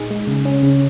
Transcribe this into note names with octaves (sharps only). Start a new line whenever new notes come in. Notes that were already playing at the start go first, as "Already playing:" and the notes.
Already playing: A#2 D#4 G#4
G#3
C#3
C#4
C#3